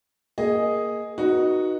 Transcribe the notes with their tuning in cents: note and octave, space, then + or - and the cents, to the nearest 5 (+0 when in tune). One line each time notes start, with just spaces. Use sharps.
A#3 +0 G#4 +0 D#5 +0
B3 -30 D#4 +0 F#4 +0